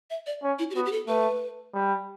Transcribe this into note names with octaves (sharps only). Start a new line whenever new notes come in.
E5
D5
C#4
E4
G4
B3 F#4
G4
A4
A3 B4
G3